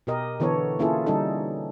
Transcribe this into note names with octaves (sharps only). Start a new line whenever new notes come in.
B2 G4 A#4 D#5
D3 E3 B3 A4 C#5
A#3 C#4 E4 F4 G#4 A4
D3 G3 C#4 D#4 A4